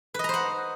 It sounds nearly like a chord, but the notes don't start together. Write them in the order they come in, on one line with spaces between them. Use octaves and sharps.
B4 D#5 A#5 C5 F#5